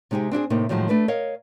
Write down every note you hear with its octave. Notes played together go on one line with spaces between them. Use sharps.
C3 G#3 D#4 G4 G#4
C4 D4 E4 G#4
A2 C3 A#3 D#4
A2 D#3 F3 F#3 G#3
A3 D4 B4
A#4 C#5 D#5 F5